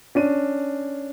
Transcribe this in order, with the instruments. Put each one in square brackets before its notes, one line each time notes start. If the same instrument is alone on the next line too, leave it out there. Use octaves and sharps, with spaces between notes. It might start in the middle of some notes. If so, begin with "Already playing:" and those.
[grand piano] C#4 D4 D#7